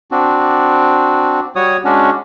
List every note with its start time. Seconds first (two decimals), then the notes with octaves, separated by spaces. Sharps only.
0.11 C4 D4 F#4
1.56 G3 F#4 C#5 D#6
1.85 G#3 C#4 D4 F#4